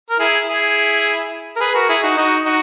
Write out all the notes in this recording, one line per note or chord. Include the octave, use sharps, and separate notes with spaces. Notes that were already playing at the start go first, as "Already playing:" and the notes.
A#4
E4 G#4
E4 G#4
A#4
G#4 B4
F#4 A#4
E4 G#4
D#4 F#4
D#4 F#4
D#4 F#4